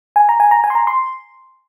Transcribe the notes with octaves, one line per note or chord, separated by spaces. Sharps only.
G#5
A#5
G#5
A#5
G#5
C6
A#5
C6